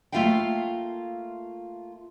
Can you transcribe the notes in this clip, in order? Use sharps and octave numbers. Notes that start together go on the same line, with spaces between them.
A3 A#3 F4 E5 F5 G5